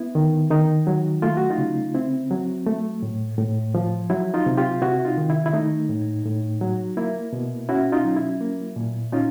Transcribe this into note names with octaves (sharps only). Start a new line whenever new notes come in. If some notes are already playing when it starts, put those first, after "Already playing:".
Already playing: B3 E4
D#3
D#3 D#4
F#3
A3 F4
F#4
D#4 F4
C#3
C4 E4
F#3
A3
A2
A2
F3
F#3 E4
D#4 F4
C3
F4 G4
C3 E4 F#4
D#4 F4
D#3
E4
E4
A3 D#4
A2
A2
F#3
A#3 E4
B2
C#4 E4 F#4
D#4 F4
F#3
E4
A#3
A#2
C#4 D#4 F4